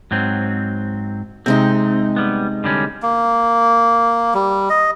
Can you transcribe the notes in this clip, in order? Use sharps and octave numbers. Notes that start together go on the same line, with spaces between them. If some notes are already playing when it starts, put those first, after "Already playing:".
G#2 F#3 C4
C3 G#3 C4 D#4
G3 B3
D3 G3 C#4
A#3
G3
D#5